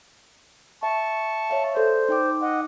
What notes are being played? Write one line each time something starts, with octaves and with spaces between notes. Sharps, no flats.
E5 A5 C#6
C#5 E5 F5
A4 C5 D5
D#4 G5 D6
D#5 F#5